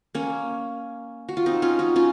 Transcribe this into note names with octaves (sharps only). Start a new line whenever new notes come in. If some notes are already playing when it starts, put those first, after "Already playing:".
A#3 C#4
F#4
F4
C4 D#4
C#4 F4
D#4 F#4
C#4 F4